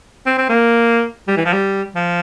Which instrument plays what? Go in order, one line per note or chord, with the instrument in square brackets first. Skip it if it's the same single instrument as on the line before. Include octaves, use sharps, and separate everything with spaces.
[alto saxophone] C4
C4
A#3
G3
E3
F3
G3
F3